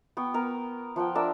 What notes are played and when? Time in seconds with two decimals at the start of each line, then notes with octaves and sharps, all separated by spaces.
0.17 B3 G5 C#6
0.34 B3 A#4
0.96 F3 F#5 G5
1.15 D4 A#4 E5